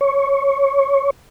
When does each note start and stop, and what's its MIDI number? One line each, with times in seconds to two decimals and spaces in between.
0.01 1.10 73